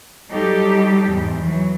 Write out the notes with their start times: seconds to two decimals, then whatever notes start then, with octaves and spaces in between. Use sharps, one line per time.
0.30 F#3 G3 D#4 G4 A4
1.08 E2 G#2
1.43 E3 F#3